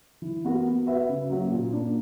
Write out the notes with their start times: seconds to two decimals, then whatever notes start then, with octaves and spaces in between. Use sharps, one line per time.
0.22 E3
0.44 B3 F#4 A#4
0.65 B3
0.87 F#4 B4 E5
1.09 C#3
1.30 F#3 A#3 C#4 F#4
1.51 A#2
1.72 A#3 D4